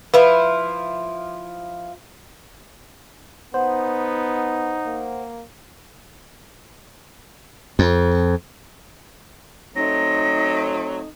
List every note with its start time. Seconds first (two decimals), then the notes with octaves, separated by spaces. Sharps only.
0.14 F3 E4 F4 B4
3.54 B3 D#4 C5 F#5
4.86 A#3
7.79 F2
9.76 F#3 A3 C4 D#4 A#6